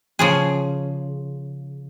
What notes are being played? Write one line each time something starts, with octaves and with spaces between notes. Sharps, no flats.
C#3 F3 G#4